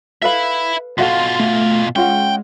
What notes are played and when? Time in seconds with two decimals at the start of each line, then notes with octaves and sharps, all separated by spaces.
0.22 A4 B4 E5 F5 B5
0.98 B2 F4 F#4 A4 F5 C6
1.40 A3
1.96 G#3 C#4 F4 F#5 G5